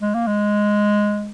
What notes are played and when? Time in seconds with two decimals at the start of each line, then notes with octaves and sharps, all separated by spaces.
0.01 G#3
0.14 A#3
0.27 G#3